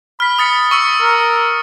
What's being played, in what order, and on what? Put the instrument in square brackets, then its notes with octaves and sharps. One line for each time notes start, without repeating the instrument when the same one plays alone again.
[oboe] B5 [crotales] F6 B6
[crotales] D#6 A6 C#7
C#6 E6 C#7
[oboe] A#4